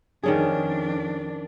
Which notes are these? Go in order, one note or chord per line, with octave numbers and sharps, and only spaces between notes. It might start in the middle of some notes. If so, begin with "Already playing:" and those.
F2 D#3 C#4 D4 G#4